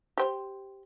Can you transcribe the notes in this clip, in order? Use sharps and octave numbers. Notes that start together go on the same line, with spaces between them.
G4 C5